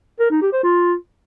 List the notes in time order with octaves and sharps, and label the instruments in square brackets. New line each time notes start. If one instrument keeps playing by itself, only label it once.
[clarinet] A#4
D#4
G4
C5
F4